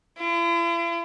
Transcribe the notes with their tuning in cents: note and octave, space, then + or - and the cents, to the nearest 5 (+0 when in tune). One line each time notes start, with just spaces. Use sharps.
E4 +45